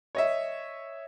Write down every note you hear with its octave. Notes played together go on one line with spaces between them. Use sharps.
C#5 D#5 E5